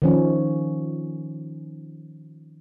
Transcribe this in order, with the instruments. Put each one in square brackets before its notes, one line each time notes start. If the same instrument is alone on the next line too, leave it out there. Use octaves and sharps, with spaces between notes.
[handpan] D#3 F3 C#4